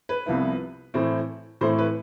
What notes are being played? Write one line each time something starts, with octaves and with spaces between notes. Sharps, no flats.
B4
C2 C3 F3 B3 E4
A2 E3 A3 C4 E4
A2 E3 A3 C4 E4 C5
B4